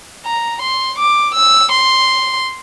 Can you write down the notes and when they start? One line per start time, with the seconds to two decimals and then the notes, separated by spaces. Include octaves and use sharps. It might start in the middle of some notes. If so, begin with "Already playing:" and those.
0.25 A#5
0.62 C6
0.98 D6
1.35 E6
1.72 C6